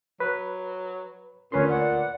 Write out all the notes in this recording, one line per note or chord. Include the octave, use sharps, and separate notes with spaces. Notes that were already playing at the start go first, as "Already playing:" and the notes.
F#3 B4
D2 A#2 C#4 B4 C6
D5 F#5